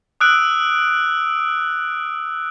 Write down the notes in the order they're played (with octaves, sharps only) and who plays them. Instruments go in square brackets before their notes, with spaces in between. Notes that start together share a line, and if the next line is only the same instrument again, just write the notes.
[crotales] D#6 E6 F#6 D7